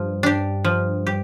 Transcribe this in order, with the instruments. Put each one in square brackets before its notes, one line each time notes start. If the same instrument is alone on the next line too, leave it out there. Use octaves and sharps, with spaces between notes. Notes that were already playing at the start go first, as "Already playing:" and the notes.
Already playing: [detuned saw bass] G2 [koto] F3
[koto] D4 G4
F3
G4